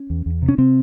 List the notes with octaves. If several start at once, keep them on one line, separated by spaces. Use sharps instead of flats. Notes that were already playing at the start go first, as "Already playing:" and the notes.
Already playing: C#4
E2
E2
C3
C#4
C3 C4